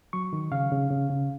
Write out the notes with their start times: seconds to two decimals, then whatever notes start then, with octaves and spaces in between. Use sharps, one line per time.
0.13 F#3 C#6
0.33 D#3
0.52 C#3 F5
0.72 C#3
0.90 C#3
1.10 C#3